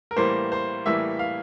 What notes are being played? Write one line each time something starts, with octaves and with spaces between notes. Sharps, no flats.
A#4
A2 E3 G3 A#3 C5
C5
A2 E3 G3 A#3 E5
F5